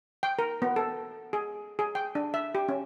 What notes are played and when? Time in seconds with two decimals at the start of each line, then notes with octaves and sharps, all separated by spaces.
0.23 G5
0.39 A#4
0.62 B3
0.76 A4
1.33 G#4
1.79 G#4
1.95 G5
2.15 D4
2.34 E5
2.55 G4
2.69 C#4